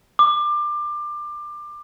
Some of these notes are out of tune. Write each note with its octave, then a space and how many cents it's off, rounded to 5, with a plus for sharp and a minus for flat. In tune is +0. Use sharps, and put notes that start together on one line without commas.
D6 +25